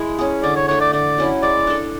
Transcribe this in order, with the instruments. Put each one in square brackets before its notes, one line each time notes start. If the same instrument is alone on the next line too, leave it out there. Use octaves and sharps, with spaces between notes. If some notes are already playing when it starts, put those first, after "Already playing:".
Already playing: [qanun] G#3 E4
C#4 G#4
[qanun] D3 [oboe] D5
[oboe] C#5
[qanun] A3 D4 [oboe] C#5
[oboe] D5
[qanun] D3 [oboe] D5
[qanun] F#3 C#4 E4
[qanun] G#3 [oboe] D5
[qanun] D4 A4